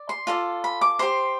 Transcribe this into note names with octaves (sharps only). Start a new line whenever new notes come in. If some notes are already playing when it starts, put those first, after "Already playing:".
Already playing: D5
C6
F4 A4 D5
B5
D6
G4 C5 C6